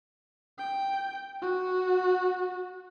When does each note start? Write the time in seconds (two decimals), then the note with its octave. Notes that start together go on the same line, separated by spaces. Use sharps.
0.58 G5
1.42 F#4